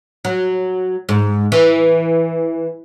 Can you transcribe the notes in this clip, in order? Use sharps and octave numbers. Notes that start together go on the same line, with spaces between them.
F#3
G#2
E3